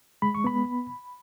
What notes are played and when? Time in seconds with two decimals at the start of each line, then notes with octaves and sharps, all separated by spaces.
0.22 G#3 B5
0.35 C#6
0.44 B3 B5